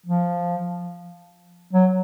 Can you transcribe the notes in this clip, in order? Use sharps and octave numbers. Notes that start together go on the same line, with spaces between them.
F3
F#3